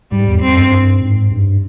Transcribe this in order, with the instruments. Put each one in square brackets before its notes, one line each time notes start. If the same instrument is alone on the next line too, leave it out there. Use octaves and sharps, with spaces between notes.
[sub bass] G#2 [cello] G3
[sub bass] E2
[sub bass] F2 [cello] C4
[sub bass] F#2
G2
G#2
G2